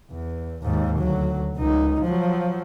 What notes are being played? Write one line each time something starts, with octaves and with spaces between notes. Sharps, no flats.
E2
D#2 G#2
D2 F#3
C#2 D#4
F3 F#3